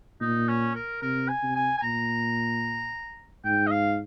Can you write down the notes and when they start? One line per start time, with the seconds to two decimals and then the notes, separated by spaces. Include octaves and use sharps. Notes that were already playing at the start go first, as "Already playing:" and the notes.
0.21 A#2 D#4
0.49 C#4
0.75 A#4
1.02 C3 A#4
1.29 G#5
1.43 C3
1.56 G#5
1.78 G#5
1.82 A#2 A#5
3.45 G#2 G5
3.67 D#5
3.71 F5